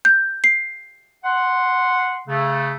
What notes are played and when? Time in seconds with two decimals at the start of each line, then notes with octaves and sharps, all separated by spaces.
0.05 G6
0.44 C7
1.24 F#5 C6
2.28 C#3 A3